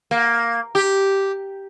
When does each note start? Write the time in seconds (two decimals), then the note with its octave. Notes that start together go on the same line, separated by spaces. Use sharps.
0.11 A#3
0.75 G4